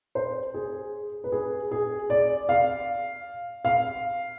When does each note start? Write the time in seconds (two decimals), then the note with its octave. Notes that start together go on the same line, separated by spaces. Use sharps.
0.15 C5
0.54 G#4
1.24 B4
1.32 G#4
1.71 G#4
2.10 D5
2.49 F5
3.65 F5